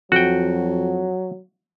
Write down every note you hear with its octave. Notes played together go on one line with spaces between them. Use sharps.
F2 F#3 F#4 G5